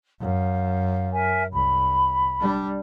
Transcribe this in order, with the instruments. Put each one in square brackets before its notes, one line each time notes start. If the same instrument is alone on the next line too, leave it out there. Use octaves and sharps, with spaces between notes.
[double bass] F#2 [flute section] F5
[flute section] A#4 E5 G#5
[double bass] C2 [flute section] B5
[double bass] G3 D4